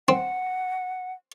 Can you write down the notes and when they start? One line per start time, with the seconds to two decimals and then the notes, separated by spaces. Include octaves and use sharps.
0.09 C4 F#5